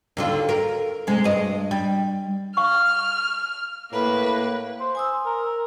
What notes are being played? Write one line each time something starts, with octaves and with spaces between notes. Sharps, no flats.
D#2 D3 F4
A#4
C3 G#3
G2 D#5
G3
F5 C#6 F6
A2 A#3 B4
C5
G#5 D#6 E6
A#4